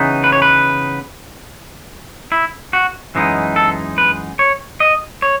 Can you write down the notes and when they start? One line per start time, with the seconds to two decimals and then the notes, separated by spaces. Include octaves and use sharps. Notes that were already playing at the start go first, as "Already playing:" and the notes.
Already playing: C#3 E3 B3 D#4
0.24 B4
0.32 C#5
0.42 B4
2.32 E4
2.73 F#4
3.15 F#2 E3 G#3 B3 D#4
3.56 A4
3.98 B4
4.39 C#5
4.80 D#5
5.22 C#5